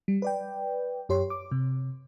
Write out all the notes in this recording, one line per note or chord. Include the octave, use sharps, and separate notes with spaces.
G3
B4 D5 G5
F#2 G4 C#5 C6
D6
C3